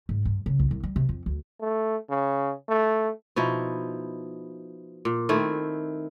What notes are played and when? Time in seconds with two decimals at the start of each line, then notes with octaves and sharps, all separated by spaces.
0.09 G#2
0.25 G2
0.46 C#3
0.59 C2
0.71 C2
0.83 G3
0.96 C3
1.09 F2
1.26 D2
1.61 A3
2.10 C#3
2.69 A3
3.36 B2 F3 D#4 E4
5.05 A#2
5.29 D#3 A3 C4 E4